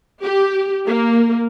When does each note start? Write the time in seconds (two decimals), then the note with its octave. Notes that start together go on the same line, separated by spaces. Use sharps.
0.22 G4
0.86 A#3